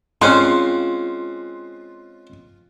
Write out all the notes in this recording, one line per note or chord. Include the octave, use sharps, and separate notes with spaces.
G#3 C4 C#4 F4 C6 F#6